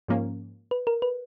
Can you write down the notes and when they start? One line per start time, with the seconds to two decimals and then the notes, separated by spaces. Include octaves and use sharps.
0.08 G#2 F3 A#3 C#4
0.71 B4
0.87 A#4
1.02 B4